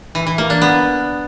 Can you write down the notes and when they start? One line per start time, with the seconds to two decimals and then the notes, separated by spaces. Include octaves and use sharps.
0.15 E3
0.27 E3
0.38 A#3
0.50 D4
0.62 B3